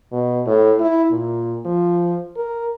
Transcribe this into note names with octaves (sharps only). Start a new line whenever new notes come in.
B2
A2
E4
A#2
F3
A#4